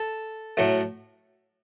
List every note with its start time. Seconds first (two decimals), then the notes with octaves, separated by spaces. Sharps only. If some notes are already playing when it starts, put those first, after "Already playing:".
Already playing: A4
0.57 A2 F#3 A3